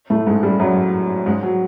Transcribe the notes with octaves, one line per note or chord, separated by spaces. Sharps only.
A2 A3
G#2 G#3
G2 G3
F#2 F#3
G#2 G#3
F#3